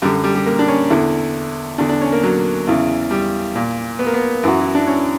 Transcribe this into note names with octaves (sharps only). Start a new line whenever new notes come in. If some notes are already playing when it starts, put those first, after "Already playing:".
F#2 D3 G3
G3
G3
A#3
D4
C#4
E2 D3 E4
E2 D3 D4
D4
C#4
A#3
F#3
E2 C#3 E3
G3
A#2
B3
A#3
B3
F#2 E3 F#4
E4
D4
C#4